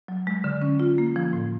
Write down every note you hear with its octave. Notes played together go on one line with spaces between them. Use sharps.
F#3
G#3
D3
C#4
F4
A#3
F3
A2